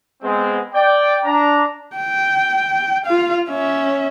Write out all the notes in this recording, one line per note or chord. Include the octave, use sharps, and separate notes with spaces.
G#3 B3 C4
D5 G5
D4 A#5
G5
F4 F5
C#4 E5